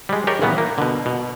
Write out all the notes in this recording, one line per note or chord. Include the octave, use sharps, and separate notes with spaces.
G3 G#3
G4 G#4 A#4 C#5 D5
A#2 E3 G3 B3 C#4
A#3
B2 D3
B2